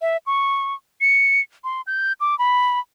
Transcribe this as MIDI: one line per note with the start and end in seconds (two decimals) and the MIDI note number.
0.02 0.17 76
0.26 0.74 85
1.01 1.41 97
1.64 1.81 84
1.87 2.13 91
2.21 2.37 86
2.39 2.79 83